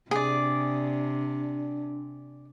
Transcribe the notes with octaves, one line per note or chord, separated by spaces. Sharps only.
C3 D4 G#4 D5